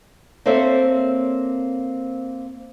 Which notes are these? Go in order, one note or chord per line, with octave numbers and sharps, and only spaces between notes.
A#3 C4 A4 C5 C#5 E5